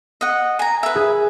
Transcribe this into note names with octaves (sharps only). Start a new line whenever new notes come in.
D#5 F#5
G#5 A#5
B4 E5
G#4